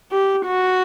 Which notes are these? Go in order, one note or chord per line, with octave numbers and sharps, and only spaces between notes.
G4
F#4